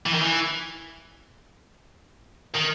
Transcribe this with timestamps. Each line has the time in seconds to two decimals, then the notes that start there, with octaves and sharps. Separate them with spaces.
0.06 E3
0.13 D#3
0.22 E3
2.55 D#3